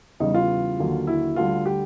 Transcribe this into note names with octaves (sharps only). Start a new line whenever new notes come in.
E2 C#3 E3 G3 D#4
F4
D#2 D3 F#3
E4
D2 D3 G3 F4
G4